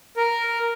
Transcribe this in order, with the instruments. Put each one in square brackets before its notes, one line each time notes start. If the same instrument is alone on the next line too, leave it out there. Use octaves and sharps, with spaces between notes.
[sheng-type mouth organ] A#4